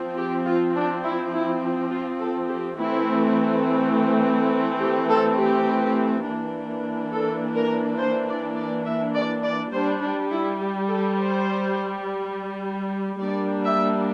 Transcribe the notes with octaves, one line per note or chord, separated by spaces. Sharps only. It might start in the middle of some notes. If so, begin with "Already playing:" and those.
Already playing: F3 C4
G4
F4
D4
E4
E4
F4
A4
G4
E3 A3 C4 E4
G4
A4
G4
E3 A#3 D4
A4
A#4
C5
D5
D5
E5
D5
D5
G3 D4 C5
D4
E4
G4
A4
C5
G3 A#3 D4 D5
E5